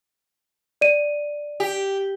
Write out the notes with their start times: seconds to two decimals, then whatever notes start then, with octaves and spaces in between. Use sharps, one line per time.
0.81 D5 D#7
1.60 G4